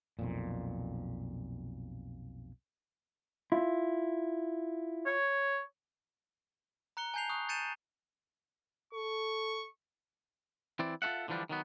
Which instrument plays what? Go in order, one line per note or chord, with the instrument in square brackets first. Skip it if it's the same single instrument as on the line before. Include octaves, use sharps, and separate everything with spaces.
[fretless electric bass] B1 F2 A#2
[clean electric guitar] E4 [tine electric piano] F4
[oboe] C#5
[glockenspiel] A#5 F#6 C#7 G7
G#5 A5 G6 C7 F7
C#6 D#6 F#6
G6 A6 C#7 D#7 E7
[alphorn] A4 [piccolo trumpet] C#6
[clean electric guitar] E3 C4 E4 D5
F4 F#4 A4 E5 F#5
D3 E3 F3 G3 D4
D#3 F#3 B3